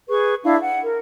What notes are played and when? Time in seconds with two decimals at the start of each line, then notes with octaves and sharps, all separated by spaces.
0.08 G#4 B4 C#6
0.44 D4 E4 F5
0.61 F#5
0.83 A#4